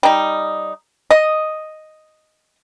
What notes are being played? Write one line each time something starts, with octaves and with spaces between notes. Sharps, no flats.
G3 D#4
D#5